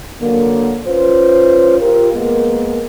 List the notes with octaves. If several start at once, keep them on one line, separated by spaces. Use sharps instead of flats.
D3 F#3 A#3
C#4 F4 B4 C5
F4 G4 A#4
G#3 A#3 B3 A#4